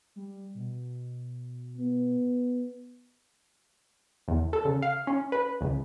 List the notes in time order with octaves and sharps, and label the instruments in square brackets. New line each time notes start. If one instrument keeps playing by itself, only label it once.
[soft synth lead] G3
B2
[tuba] B3
[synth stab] E2
A4
C#3
F5
C#4
B4
C#2